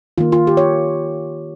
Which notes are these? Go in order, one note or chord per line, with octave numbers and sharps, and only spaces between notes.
D#3 A#3 F4
F4
G4
C#5